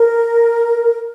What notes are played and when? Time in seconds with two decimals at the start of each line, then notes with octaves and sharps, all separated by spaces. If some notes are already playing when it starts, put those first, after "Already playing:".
Already playing: A#4